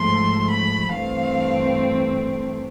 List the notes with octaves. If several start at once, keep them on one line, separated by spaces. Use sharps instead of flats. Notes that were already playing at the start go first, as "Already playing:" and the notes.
Already playing: G#2 F3 A3 C6
B5
G2 E3 A3 C4 F5